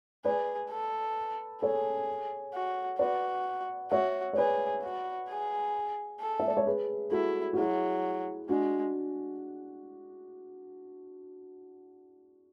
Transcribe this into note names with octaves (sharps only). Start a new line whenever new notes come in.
G#4 B4 D5
A4
G#4 A4 C#5
F#4
F#4 B4 D5
F#4 C#5 E5
C#5
G#4 B4 D5
F#4
G#4
A4
E5
D5
C#5
G#4 B4
E4 F#4 A4
F#4
F#3 E4 G#4
G#3 D4 F#4